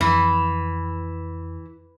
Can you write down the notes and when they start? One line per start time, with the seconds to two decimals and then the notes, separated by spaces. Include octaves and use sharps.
0.01 F2 E3